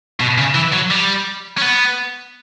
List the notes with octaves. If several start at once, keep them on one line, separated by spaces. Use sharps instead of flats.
B2
C#3
E3
F#3
G3
C#4
B3